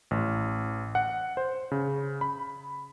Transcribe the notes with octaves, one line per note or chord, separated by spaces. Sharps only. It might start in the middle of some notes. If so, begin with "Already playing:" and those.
A1
F#5
C5
C#3
B5